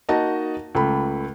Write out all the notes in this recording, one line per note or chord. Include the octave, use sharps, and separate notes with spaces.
A#3 D#4 F#4 D#5 A5
C#2 A3 B5